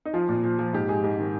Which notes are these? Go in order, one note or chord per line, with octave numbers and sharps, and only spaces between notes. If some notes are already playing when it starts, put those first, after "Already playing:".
D#4
F3 F4
A#2
F3
F3
G#2 G4
G#2 G#4
G#2
D#3